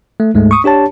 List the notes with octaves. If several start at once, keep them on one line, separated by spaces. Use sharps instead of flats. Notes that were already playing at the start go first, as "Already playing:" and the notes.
A3
D2 G#2 G#3 A3
C#6 D#6
D4 G4 C#5 A5